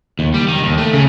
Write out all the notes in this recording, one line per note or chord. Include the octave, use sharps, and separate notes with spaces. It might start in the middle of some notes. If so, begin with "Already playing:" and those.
D#2
G3
D#3
D#2
A3
C#3